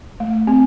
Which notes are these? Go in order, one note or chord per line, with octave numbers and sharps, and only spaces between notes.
A3
C4